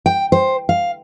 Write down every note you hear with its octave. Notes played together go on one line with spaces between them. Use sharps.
G5
C5
F5